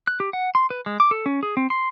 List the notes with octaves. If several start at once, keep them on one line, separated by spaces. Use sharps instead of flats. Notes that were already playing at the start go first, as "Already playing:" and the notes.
F#6
G4
F#5
C6
B4
G#3
D6
A4
C#4
G#4
C4
C6